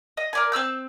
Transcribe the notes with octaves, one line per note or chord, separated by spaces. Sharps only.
D#5
A#4 D5 G#5
C4 G#4 E6 G6